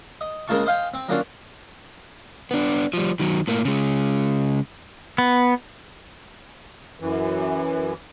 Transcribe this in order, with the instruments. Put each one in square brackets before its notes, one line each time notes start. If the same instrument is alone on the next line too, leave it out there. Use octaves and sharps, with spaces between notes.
[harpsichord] D#5
C#3 G#3 A#3 F4 A5 C#6
C5 D#5 F5 G5 G#5
C4
F#3 A#3 C#4 D4 F4 F#4
[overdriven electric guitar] B3 D4
F3 G3
D#3 F#3
A2 A#3
C#3 G#3
[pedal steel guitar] B3
[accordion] F#2 E3